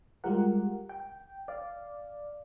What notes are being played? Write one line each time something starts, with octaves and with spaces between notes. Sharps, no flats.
G3 G#3 F4 G4 A#4 F#5
G5
D5 F5